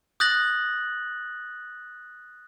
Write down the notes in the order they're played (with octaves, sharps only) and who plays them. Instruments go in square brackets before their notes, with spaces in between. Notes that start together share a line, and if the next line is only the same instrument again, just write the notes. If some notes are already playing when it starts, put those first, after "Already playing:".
[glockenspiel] D#6 F#6 G6 A6 A#6 F#7